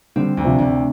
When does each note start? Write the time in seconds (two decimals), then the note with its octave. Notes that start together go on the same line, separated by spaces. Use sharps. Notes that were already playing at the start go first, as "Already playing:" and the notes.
0.16 D3 G3 C4
0.37 D2
0.44 C3 F3
0.58 D2 C3